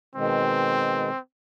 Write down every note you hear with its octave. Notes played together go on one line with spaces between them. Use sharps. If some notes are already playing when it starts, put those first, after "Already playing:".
B2 D#3 G#3 C4